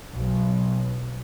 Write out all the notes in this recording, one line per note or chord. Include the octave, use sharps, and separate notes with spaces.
B1